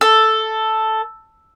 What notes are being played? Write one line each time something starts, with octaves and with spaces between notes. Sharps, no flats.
A4